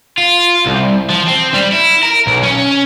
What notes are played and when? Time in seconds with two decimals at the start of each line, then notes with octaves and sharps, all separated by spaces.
0.18 F4
0.66 C2
1.09 F3
1.28 C4
1.54 G3
1.72 E4
2.03 A#4
2.27 B1
2.43 C#4